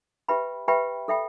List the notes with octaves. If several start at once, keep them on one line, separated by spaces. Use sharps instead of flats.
G4 B4 E5 G5 B5
G4 B4 E5 G5 B5
A4 E5 G5 B5